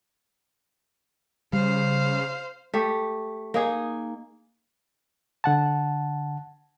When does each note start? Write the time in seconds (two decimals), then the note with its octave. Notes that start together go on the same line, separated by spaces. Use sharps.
1.53 C#3 G3 C5 F5
2.74 A3 G4
3.54 A#3 D#4 G#4
5.44 D3 F#5 A5